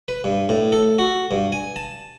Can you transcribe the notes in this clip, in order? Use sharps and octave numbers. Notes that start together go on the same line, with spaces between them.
B4
G2
A2
A4
F#4
G2
G#5
A5